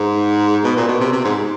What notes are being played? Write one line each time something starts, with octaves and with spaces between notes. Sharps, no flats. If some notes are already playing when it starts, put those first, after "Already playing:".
Already playing: G#2
B2
A#2
B2
C3
C3
G#2